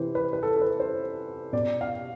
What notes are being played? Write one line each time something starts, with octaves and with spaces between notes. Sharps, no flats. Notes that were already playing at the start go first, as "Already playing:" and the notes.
Already playing: C3 E3 B4 C5
B4
B4
A4
A4
B4
C5
B2 D5
F5